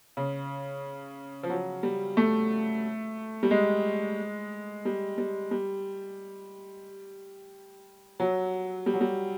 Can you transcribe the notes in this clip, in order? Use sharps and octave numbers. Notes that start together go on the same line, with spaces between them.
C#3
F3
F#3
G3
A3
G3
G#3
G3
G3
G3
F#3
G3
F#3
G3